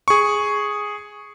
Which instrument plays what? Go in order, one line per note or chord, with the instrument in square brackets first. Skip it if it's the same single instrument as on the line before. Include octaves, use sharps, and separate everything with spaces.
[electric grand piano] G#4 C#6